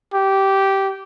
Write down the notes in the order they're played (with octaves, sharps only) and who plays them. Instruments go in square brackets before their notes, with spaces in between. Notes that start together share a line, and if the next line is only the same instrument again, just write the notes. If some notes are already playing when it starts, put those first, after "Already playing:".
[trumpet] G4